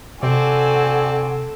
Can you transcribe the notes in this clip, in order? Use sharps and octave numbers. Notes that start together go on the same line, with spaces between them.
C3 C4 F#4 A4 D5 G#5